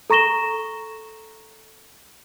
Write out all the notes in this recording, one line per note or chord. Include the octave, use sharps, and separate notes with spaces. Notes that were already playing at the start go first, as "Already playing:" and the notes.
A4 A#5 C#6 A#6 E7 G7